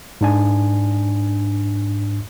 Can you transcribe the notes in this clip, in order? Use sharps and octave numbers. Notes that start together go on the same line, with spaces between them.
G#2 D4 G#5